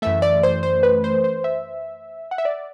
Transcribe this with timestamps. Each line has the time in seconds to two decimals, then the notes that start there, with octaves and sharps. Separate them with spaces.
0.02 F#2 E3 A3 E5
0.22 D5
0.43 C5
0.63 C5
0.83 B4
1.04 C5
1.24 C5
1.44 E5
2.31 F#5
2.38 E5
2.45 D5